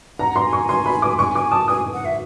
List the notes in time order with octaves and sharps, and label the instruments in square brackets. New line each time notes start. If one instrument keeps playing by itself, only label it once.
[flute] F#5 [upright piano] A#5
[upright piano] C6
[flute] G#5
[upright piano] C#6
[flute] G#5 [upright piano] C6
[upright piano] B5
D6
[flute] G#5 [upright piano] C#6
[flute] G#5 [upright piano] D6
[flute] A5 [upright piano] D#6
[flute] G#5 [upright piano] D#6
[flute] F#5
E5